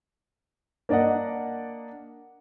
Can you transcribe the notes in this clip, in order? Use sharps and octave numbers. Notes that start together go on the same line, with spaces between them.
A#3 D4 D5 D#5 F#5